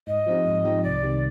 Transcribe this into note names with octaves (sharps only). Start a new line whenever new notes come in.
G#2 D#5
F3 C4 D#4 G4
G#2
F3 C4 D#4 G4
C2 D5
C3 D#3 G3